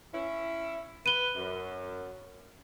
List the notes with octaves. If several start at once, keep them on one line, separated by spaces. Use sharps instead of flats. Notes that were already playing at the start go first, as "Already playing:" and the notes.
C#4 E4
B4 D#7 G7
F#2